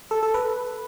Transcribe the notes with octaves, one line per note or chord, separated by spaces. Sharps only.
A4
A4
B4